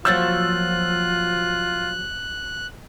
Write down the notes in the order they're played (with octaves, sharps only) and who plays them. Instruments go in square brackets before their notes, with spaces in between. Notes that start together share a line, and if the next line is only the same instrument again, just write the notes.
[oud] F3 F#3 A#3 [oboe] F4 [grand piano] E6 G6 A6 [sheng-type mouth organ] F#6